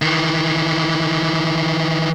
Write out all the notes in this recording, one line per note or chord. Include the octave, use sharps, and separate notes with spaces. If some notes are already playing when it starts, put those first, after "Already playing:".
D#3 E3